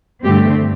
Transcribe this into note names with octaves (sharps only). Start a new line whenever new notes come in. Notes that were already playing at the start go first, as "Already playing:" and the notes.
G2 D3 G3 A3 C4 G4